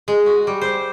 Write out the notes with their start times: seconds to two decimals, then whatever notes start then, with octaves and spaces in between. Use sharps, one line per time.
0.08 G#3
0.26 F#4
0.47 G3
0.61 C5